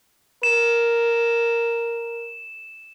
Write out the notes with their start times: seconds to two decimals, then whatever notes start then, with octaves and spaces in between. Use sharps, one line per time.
0.43 A#4 E7